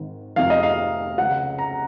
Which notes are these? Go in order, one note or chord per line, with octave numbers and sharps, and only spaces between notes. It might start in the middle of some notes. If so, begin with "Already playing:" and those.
Already playing: G#1 G#2 D#3
F1 F2 C3 D#3 F5
D#5
F5
C#2 C#3 F#5
A#5